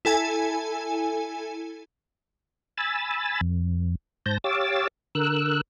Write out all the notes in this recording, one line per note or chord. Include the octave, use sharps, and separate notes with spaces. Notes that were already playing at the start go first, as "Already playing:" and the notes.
E4 A4 G#5
G#5 B5 E6 A6
F2
G#2 C5 A5 G6 A#6
G4 C#5 F5 D6 E6 A6
D3 A#4 E6 F#6